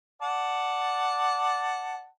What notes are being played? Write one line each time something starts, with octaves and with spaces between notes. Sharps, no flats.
D5 F#5 A5